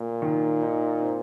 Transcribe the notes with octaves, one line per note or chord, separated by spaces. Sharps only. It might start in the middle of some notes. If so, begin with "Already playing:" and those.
Already playing: A#2
D#3
D#4
C4